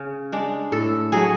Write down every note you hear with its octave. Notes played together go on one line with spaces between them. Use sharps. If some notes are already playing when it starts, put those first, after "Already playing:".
Already playing: C#3
G#3 D4
A2 A4
F#3 A3 G#4